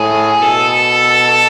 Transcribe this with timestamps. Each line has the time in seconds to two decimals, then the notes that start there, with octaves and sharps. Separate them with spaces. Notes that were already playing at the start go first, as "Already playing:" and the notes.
Already playing: A2 G#4
0.41 B2 A4